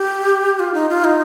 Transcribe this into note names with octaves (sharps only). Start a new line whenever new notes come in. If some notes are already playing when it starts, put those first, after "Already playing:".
Already playing: G4
F4
D#4
F4
D#4